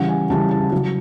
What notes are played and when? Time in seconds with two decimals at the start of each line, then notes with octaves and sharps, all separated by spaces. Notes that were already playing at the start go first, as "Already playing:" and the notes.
Already playing: C#3 E3 G3 F#5
0.09 G#5
0.30 C#3 E3 G3 A5
0.51 A5
0.72 C#3 F#3